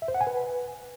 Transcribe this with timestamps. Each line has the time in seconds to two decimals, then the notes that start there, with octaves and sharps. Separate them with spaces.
0.02 E5
0.08 C5
0.14 F#5
0.21 G#5
0.27 B4